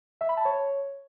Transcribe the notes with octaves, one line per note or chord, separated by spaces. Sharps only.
E5
B5
A5
C#5